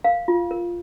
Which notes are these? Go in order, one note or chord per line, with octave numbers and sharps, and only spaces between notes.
A#4 F5
F4
A#4